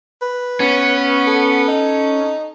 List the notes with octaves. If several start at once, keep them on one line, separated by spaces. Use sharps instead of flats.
B4
B3 C#4
A4
D#4